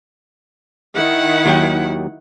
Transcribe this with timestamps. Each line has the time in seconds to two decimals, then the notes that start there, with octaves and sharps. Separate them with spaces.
0.96 D#3 E4 F#5
1.46 D#2 F#3 G5